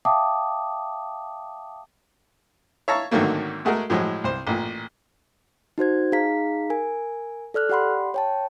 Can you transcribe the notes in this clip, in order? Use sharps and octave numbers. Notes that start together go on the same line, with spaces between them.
E5 F5 G5 A5 D6 D#6
C#5 E5 F5 A5 A#5 C#6
G#1 D3 D#3 F#3 A3 A#3
G#3 A3 F#4 G#4 A#4
A2 F3 F#3 G#3
C2 C5
A1 A#2
D#4 F#4 C5 G#6
D#4 G#4 F5 A#5 B6
A#4 G#5
A4 D5 F6 F#6
G4 D5 F#5 B5 C6
C#5 G5 A5